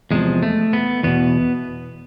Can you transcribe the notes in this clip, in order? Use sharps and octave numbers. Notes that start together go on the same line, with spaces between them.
E2 C3 F3 G#3
A3
B3
E2 B2 B3